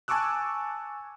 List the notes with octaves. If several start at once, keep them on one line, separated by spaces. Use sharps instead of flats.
G#5 A5 C#6 D6 E6 F#6